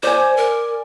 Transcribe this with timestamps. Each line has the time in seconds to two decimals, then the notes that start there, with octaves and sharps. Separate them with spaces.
0.03 C5 D5 G#5
0.37 A#4